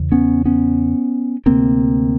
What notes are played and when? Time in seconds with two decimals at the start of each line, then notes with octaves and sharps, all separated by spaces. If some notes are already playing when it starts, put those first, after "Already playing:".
Already playing: E2 C#3
0.12 B3 C#4
0.45 B3 C#4
1.46 D2 C3 A#3 C4